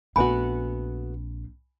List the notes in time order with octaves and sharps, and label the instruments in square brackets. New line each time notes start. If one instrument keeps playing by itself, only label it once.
[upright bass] A#1 C4 [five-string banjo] A3 B3 F#4 [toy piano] G#5 B5